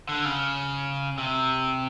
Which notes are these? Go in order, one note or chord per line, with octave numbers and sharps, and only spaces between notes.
D3
C#3
C3